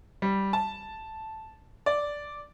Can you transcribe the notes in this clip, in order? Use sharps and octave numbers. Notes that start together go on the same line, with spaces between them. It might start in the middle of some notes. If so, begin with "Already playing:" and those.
G3
A5
D5